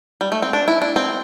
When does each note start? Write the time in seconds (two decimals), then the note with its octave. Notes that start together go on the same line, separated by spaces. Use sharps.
0.21 G3
0.32 A3
0.42 C4
0.53 D4
0.68 E4
0.82 D4
0.96 C4